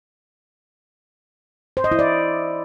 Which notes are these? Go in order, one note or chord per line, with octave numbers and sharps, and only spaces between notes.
C5
D#5
E4
D5